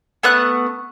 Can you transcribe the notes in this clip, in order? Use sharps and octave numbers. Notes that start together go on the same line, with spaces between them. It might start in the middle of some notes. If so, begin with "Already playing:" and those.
A3 B3 F#5 F#6